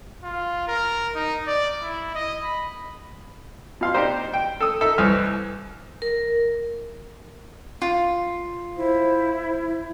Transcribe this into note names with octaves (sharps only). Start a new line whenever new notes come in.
F4
A#4
D#4
D5
E4
D#5
B5
B2 F5 C6
D4 D#4 G4 C5
G5
A4 D#6
D#4 A4 E5
C2 E3 G#5 F6
A#4
F4
E4 C5